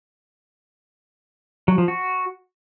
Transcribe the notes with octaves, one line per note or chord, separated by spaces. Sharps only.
F#3
F3
F#4